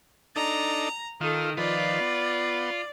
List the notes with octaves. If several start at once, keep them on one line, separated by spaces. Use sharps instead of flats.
D4 D#4 A4 A#5
D#3 D#4 F4 A4
D#3 F3 F4 B4 D5
B3